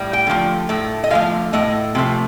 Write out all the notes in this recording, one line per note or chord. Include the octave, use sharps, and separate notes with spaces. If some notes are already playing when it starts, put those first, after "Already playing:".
Already playing: A2 G3
G5
D3 F3 A3
A2 A3
D#5
D3 F3 A3 F5
A2 A3 D#5
C3 F3 A3